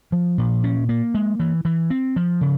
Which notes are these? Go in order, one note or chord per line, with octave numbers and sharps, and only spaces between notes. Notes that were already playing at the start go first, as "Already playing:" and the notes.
F3
A#2
C#4
A#3
G#3
E3
E3
C4
F3
C#3